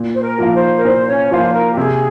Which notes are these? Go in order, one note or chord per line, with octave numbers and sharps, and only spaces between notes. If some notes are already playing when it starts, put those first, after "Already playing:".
Already playing: A#2
C5
A#4
F3 A#3 F4
C5
A#4
A#2 C5
C#4 C#5
F3 A#3 F4 C5
A#4
G4
C3 G#4